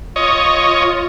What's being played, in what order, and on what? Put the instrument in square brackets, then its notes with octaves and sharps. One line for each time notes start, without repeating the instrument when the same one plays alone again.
[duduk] F4 [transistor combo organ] C#5 D#5